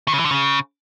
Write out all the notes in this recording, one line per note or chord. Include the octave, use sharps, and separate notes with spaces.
D#3
C#3
E3
D3
C#3